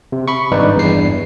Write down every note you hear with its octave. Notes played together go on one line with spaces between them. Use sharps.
C3
B5 C#6
G#1 G2 D#4 B4 D5
E2 G2 C7